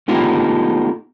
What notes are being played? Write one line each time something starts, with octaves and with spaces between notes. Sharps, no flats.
A3 B3 D#4 F4 G4